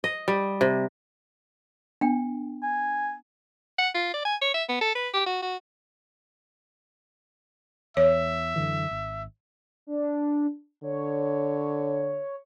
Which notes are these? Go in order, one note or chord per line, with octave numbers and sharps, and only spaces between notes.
D#5
G3
C3
B3 D4 G5
G#5
F#5
F4
D5
G#5
C#5
E5
B3
A4
B4
G4
F#4
F#4
E2 C#5 E5
F#2 D3 E3
G#1
D4
D3 C#5